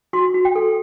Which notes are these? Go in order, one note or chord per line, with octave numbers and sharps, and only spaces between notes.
F#4 C6
F#4
G5
A4